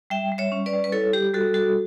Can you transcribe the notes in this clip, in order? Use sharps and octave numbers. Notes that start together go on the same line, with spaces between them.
G3 E5 G5
G3
C#5 E5
C#4
B4 D5
G3
B4
E4 A4 C#5
G3 G4
G3 F#4 A4
G3 F#4 A4